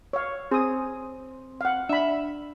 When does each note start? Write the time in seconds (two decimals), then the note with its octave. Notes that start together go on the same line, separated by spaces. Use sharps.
0.13 C#5 F5
0.51 C4 G#4 D#6
1.61 F5 F#5
1.89 D4 E5 B5